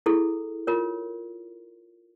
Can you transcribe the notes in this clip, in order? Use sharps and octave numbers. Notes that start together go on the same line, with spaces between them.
E4 G#4 A4
F4 A#4 C#5